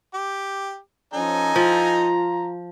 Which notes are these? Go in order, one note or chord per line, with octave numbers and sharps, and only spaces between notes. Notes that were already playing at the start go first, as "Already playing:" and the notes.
G4 D6
F3 C#4 D#4 A4 G#5 A#5
F3 F4